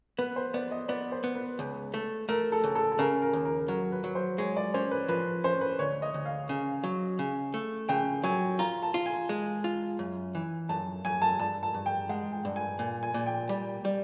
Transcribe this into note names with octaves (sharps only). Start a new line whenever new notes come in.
B3 B4
C5
B3 D5
D#5
B3 D5
C5
B3
B4
C#2
A3
A3 A#4
A4
C#2
A4
A4
C#3 A#4
A#4
D#2
A#4
F#3 A#4
B4
F#3
C5
G#3 C#5
D5
C#4 C5
B4
F3 B4
C#4 C5
B4
D2 C#5
D#5
D2
F5
C#3
F#3
C#3
A3
C#3 G5
F#3 G#5
F4 A#5
A5
F4
G#5
G#3
F4
F#2
E3
F#2 A5
F#2 G#5
A5
G2 A5
A5
G2
G5
G#3 F#5
G5
G2
G#5
A#2 G#5
G#5
A#2
G5
G3
G3